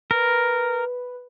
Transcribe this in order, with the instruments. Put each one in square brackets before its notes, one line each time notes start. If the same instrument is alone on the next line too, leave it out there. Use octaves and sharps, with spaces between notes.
[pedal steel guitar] A#4 [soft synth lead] B4